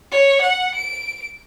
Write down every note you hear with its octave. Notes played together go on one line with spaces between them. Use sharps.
C#5
F#5
D7